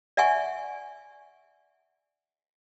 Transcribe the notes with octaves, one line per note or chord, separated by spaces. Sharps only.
D5 E5 F#5 G#5 C#6